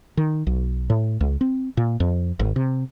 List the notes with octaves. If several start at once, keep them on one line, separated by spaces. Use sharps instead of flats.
D#3
B1
A2
C#2
C4
A#2
F2
G#1
C3